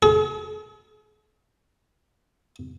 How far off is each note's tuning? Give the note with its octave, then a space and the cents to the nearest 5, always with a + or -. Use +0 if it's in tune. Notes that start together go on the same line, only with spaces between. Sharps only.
G#4 +45